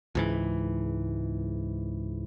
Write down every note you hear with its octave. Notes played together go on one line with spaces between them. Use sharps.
C#2 G#2 E3